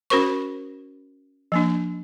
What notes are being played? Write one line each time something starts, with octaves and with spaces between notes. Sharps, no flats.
C#4 F#4 A#4 C5 C#6
F3 A#3 D4